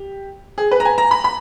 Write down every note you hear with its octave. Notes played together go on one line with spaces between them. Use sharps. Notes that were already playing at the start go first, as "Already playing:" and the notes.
Already playing: G4
G#4
B4
A#5
G#5
A#5
B5
B5